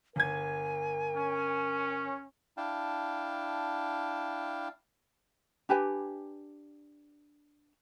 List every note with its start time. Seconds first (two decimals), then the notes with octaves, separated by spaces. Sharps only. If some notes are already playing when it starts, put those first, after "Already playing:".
0.16 G1 A#4 G#5 G#6
1.15 C#4
2.57 D4 E4 F5 G5 A5
5.69 D4 G4 B4 G#5